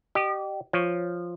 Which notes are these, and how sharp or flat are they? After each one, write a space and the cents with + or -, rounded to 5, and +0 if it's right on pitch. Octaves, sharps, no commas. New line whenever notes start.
G4 -20 D#5 -40
F3 +0 C#5 +0